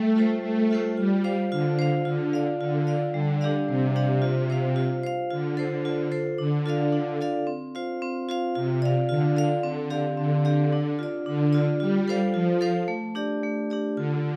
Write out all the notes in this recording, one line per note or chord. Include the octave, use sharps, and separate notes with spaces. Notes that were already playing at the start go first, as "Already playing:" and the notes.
Already playing: G3 A3
F4 A4 C5
G3 A3
F4 A4 C5
G3 F4
C5 F5
D3 F4
C5 F5
D3 F4
D5 F5
D3 F4
D5 F5
D3 G3
D4 G4 D5 F5
C3 G3
D4 G4 D5 F5
F4
C5 F5
F4
C5 F5
D3 F4
A4 C5
F4
A4 C5
D3 D4
F4 A4 D5 F5
D4
F4 A4 D5 F5
C4
F4 C5 F5
C4
F4 C5 F5
C3 F4
D5 F5
D3 F4
D5 F5
D3 C4
G4 D5 F5
D3 C4
G4 D5 F5
D4
F4 D5
D3 D4
F4 D5
G3 F4
A4 C5 F5
F3 F4
A4 C5 F5
A3
D4 G4 D5
A3
D4 G4 D5
D3 F4